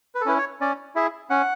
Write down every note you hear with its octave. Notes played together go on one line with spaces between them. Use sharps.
B4
A4
C#4 E4 B4
C#5
C#4 D5
E4 G#4 E5
C#4 F#5